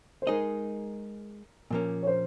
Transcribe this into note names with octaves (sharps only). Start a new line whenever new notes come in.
C5
G#3 D#4 G#4 A#4 D#5
A#2 F3 A#3 C#4 A#4
C#5
C5